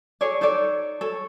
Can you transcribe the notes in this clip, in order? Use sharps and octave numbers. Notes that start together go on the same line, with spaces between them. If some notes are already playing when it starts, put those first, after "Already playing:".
G#4 A4 C#5 D5
D#4 A4 C#5 D5
A4 C#5